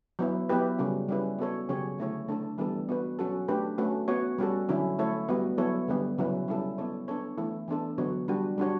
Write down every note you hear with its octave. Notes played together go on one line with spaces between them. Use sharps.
F#3 B3 E4
F#3 B3 E4 G4 B4
C#3 G3 C#4 F#4
G3 C#4 E4 B4
B3 F#4 A4 C#5
C#3 F#3 C#4 G4 C#5
D3 A3 E4 A4 C#5
A3 D4 A4
E3 G3 B3 D4 A4
B3 F#4 B4
F#3 C#4 F#4 A4
A3 D4 G4 B4
A3 C#4 F#4 B4
B3 F#4 C#5
G3 C#4 F#4 A4
D3 F#3 C#4 E4
A3 E4 A4 C#5
G3 B3 F#4
F#3 B3 E4 A4 C#5
D3 G3 B3
C#3 F#3 C#4 E4 B4
G3 C#4 E4 A4
B3 E4 A4 C#5
B3 D4 A4 C#5
E3 A3 E4 A4
E3 B3 D4 A4
D3 F#3 B3 F#4 C#5
G3 D4 F#4
G3 D4 F#4 C#5